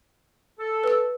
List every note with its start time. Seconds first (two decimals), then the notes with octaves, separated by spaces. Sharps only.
0.60 A4
0.84 B4 E6